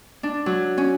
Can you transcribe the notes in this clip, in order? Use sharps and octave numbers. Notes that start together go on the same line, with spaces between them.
D4
F#3
C#4